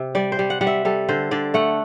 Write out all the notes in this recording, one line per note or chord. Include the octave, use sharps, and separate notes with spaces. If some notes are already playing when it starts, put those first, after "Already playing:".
Already playing: C3
G3 D5
C5
G3
F#5
G3 F#5
E5
G3 A4
D3 C5
D3 D5
A3 F#5